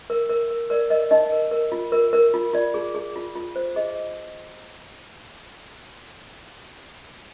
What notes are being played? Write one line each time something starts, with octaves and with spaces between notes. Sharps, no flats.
A#4
A#4
A#4
A#4 D5
A#4 D#5
D#4 D#5
A#4
A#4
F4
A#4
A#4
F4
F4 D5
G#4
G#4
F4
F4
C5
G#4 D#5